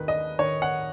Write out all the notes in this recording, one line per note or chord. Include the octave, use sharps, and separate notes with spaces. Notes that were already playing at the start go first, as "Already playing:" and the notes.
Already playing: D#2 D#3 B4
D#5
D#3 C#5
F#5